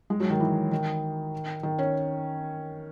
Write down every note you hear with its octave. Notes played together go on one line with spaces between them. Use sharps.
G#3
F#3
D#3
E3
D#3
D#3
C#4